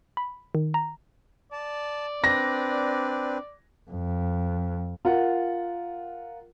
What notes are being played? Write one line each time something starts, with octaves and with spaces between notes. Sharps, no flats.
B5
D#3
A#5
D5 A5
C4 D4 B4 A#6
F2
F4 A#4 F#5